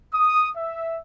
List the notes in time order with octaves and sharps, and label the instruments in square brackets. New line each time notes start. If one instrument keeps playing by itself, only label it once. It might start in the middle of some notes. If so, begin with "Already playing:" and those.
[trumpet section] D#6
E5